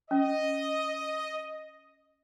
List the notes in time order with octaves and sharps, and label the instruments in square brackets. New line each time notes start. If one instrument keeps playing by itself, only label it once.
[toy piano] C#4 [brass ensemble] D#5